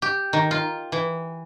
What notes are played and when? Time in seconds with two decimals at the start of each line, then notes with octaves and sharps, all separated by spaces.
0.02 G4
0.33 D#3
0.51 F4
0.92 E3